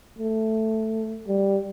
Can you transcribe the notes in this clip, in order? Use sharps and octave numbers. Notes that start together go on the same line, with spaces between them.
A3
G3